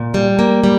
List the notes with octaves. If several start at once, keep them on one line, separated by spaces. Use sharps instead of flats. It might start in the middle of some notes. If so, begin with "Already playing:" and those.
Already playing: A#2
G3
A#3
G3